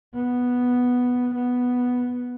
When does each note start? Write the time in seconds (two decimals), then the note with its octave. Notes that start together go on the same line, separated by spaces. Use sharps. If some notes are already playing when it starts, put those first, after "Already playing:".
0.15 B3
1.35 B3